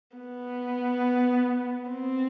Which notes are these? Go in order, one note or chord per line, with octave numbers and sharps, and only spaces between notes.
B3
C4